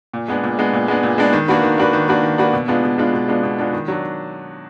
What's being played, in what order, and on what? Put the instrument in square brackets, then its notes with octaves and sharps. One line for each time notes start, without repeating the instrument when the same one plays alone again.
[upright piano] A#2
G#3 B3 D4
A#2
G#3 B3 D4
A#2
G#3 B3 D4
A#2
G#3 B3 D4
D#3
A#3 D4 F#4 B4
D#3
A#3 D4 F#4 B4
D#3
A#3 D4 F#4 B4
D#3
A#3 D4 F#4 B4
B2
G#3 B3 D4 F4
B2
G#3 B3 D4 F4
B2
G#3 B3 D4 F4
B2
G#3 B3 D4 F4
D#3
F#3 D4